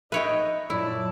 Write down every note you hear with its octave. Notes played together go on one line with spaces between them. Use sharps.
D#4 B4 C#5 D#5 E5 G5
F#2 A#2 F#3 E4 D5 A5